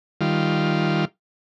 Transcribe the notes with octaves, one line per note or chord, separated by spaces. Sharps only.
D#3 G3 F4